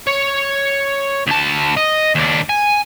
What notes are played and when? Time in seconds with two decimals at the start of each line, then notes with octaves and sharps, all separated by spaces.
0.07 C#5
1.27 D2 A5
1.77 D#5
2.15 D#2 D4
2.49 G#5